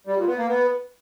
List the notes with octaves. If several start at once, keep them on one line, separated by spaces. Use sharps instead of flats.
G3
A#2
B3
A#3
B3